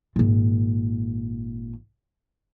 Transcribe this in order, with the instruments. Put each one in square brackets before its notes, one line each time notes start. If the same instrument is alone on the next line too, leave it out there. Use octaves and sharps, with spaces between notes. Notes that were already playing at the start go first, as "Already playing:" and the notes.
[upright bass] G#1 A#2